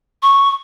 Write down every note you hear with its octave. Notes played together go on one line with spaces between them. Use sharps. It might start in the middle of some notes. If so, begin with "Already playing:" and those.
C#6